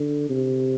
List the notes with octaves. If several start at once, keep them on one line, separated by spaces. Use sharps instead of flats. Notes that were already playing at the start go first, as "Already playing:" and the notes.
Already playing: D3
C3